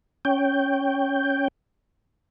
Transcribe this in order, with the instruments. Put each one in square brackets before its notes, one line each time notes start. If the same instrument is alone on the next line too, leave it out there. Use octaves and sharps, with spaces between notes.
[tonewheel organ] C#4 G5